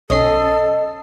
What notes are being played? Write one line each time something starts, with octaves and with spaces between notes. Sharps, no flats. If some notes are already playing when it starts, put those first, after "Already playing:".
B1 C#4 A4 D#5 C7